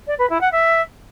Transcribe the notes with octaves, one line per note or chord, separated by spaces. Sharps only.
D5
B4
E4
F#5
E5